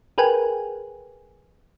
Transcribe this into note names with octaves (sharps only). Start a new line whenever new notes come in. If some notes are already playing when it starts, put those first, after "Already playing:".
G#4 A#4 B4 G5 G#5